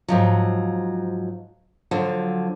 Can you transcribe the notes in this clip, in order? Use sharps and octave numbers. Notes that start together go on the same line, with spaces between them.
G#2 F3 F#3
D3 F3 F#3